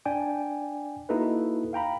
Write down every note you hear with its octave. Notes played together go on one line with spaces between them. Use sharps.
D4 D5 G5 G#5
A#3 D#4 E4 F#4 A4 B4
F5 G5 A#5 B5